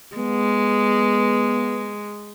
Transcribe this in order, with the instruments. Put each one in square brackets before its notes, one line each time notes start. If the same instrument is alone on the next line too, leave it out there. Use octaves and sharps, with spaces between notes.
[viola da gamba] G#3 [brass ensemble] B3